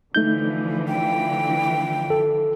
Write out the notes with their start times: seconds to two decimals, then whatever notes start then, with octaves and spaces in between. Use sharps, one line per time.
0.15 D3 E3 F3 A3 D#4 G6
0.88 G5
2.10 A4